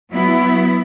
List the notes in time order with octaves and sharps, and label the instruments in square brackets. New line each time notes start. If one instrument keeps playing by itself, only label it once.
[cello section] F#3 B3 E4